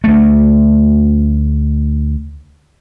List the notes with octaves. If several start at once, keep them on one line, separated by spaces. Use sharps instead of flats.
D2 A3